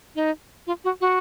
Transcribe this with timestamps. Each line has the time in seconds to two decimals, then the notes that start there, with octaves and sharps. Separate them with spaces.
0.16 D#4
0.67 F4
0.84 F#4
1.01 F#4